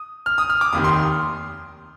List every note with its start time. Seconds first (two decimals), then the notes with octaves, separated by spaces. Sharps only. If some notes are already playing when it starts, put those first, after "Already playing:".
Already playing: D#6
0.26 F6
0.38 D#6
0.50 F6
0.61 D6
0.73 F1 D#2 D#3 D#6
0.84 C6